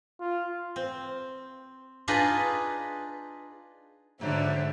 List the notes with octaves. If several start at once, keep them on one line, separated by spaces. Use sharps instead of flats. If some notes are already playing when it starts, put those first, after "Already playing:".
F4
C4
D4 D#4 F4 G#4 B4 D#5
G#2 D3 F3 G3 D4 E5